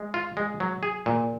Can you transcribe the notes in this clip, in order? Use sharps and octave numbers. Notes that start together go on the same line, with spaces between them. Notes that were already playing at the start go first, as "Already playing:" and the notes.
Already playing: G#3
F4
G#3
F#3
G#4
A#2